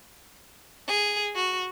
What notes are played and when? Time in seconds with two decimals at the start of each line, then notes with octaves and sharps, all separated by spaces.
0.88 G#4
1.35 F#4